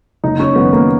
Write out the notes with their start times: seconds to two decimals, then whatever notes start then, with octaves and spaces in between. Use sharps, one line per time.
0.24 F#1 D#4
0.40 C#4
0.56 F#2 D#3 B3
0.73 A#3